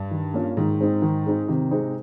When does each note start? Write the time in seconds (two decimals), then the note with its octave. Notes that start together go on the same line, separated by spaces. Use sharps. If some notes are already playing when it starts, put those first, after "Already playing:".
Already playing: G2
0.11 D#3
0.34 A#3 C#4 F4
0.57 G#2 D#3
0.80 G#3 C4 D#4
1.02 D#3
1.26 G#3 C4 D#4
1.48 C3 D#3
1.71 G#3 C4 D#4